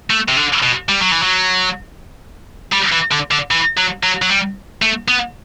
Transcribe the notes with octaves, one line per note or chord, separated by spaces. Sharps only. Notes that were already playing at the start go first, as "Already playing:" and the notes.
A3
C3
D3
B2
G3
F#3
E3
F#3
G3
E3
D3
D3
E3
F#3
F#3
F#3
G3
A3
B3